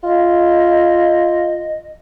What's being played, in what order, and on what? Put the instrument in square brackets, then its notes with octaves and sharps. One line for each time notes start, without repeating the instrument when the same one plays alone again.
[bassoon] F4 [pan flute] D#5